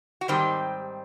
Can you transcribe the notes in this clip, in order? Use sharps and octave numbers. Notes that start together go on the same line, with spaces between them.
F#4
G#2 D#3 G3 C4 G4